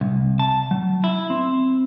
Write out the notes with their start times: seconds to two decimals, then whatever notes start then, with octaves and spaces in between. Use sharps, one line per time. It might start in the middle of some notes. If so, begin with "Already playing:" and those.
0.01 C2
0.39 A5
0.71 F#3
1.04 E4
1.30 C4